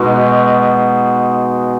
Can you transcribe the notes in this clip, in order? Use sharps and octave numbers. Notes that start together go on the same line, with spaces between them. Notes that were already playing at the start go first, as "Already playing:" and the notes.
Already playing: B2 G#3 D#4 F#4